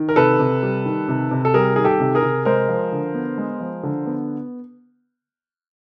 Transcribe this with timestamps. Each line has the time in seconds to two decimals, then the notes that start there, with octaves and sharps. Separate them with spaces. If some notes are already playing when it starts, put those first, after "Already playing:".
Already playing: D#3
0.09 A#4
0.16 C3 A4 B4
0.39 C3
0.63 G3
0.85 D#3
1.08 C3
1.31 C3
1.45 A4
1.54 G3 G#4 A#4
1.76 D#3 G#4
1.85 G4 A4
2.00 C3
2.15 G#4 A#4
2.22 C3
2.45 G#3 A#4 C5
2.69 F3
2.92 D3
3.14 B3
3.38 G#3
3.60 F3
3.84 D3
4.06 B3